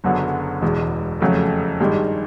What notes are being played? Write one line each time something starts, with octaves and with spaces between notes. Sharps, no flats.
F#1 F#2 D3 F#3 B3
E1 E2 B2 G#3
F2 C#3 F#3 A3
G#1 G2 D#3 G#3